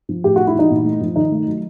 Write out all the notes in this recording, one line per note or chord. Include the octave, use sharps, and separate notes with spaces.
F3
A2 G4
F#4
G3
E4
E3 D#4
A#2
A3
F3
D#3 D#4
A3
F#3